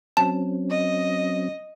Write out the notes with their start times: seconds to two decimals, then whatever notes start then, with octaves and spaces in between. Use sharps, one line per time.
0.17 F#3 C4 C#4 A5
0.70 D#5